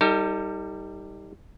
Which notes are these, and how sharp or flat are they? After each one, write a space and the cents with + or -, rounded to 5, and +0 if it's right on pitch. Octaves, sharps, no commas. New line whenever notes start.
G3 +0 D#4 +25 A4 +45